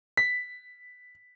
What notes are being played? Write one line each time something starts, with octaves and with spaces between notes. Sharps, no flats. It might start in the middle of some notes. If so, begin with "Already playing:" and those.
B6